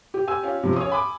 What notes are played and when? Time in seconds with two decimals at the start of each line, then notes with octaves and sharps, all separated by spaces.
0.14 G4
0.28 G#5 E6
0.43 C#4 F4
0.63 C3 F3
0.76 C#3 C#5 D#6
0.90 G#5 B5 D6